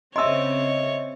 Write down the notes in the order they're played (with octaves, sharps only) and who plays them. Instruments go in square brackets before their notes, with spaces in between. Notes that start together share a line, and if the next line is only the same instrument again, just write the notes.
[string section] C#3 C4 [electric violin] C#5 [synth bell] D#5 E5 [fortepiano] C6 E6